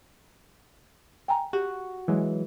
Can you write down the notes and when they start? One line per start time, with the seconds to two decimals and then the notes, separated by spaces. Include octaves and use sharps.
1.28 G5 G#5 A#5
1.53 F#4 G4
2.08 E3 F#3 G#3